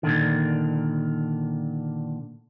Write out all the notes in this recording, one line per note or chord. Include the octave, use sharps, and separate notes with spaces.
A#2 D3 D#3